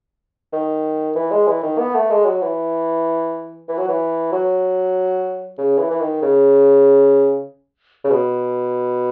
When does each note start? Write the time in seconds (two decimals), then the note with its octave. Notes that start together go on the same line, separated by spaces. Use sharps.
0.53 D#3
1.15 E3
1.31 G#3
1.47 E3
1.63 D#3
1.79 B3
1.95 A3
2.10 G#3
2.26 F#3
2.42 E3
3.69 E3
3.78 F#3
3.88 E3
4.32 F#3
5.58 C#3
5.79 E3
5.90 E3
6.00 D#3
6.22 C#3
8.04 C#3
8.11 B2